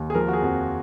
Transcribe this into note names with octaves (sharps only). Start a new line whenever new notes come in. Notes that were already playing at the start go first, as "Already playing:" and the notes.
Already playing: D#2
G#4
F3 A#4
F#4
G#4
F2 F#4
F4